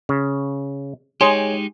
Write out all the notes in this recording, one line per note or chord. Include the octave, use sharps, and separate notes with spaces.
C#3
G#3 D#4 G4 G#4 C#5 G#5 C6